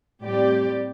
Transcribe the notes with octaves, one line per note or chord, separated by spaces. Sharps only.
A2 G3 C4 G4 D5